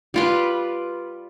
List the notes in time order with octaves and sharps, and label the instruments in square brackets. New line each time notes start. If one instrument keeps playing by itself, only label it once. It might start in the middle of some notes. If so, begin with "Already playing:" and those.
[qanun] G3 F4 B4